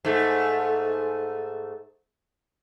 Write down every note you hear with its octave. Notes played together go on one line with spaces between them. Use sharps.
G#2 A3